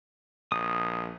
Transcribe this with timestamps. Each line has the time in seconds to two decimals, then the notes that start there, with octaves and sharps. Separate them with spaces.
0.52 A#1 D#6